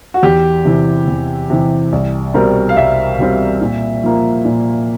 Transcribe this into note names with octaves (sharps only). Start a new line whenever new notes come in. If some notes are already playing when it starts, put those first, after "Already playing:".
F#4
E2 G4
C3 E3
E2
C3 E3
C2
B2 G3 C4 A#4
F5
C2 E5
B2 G3 C4
A#2
F3 A#3
A#2